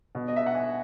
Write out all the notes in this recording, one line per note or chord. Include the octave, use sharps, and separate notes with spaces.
B2
D#5
E5
F#5
G#5